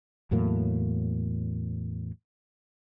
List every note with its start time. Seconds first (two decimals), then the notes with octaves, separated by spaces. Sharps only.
0.31 E2 A2 F#3 A#3